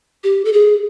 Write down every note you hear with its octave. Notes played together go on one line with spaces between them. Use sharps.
G4
A4
G#4